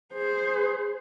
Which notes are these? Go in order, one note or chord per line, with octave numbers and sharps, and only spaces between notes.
G#4 C5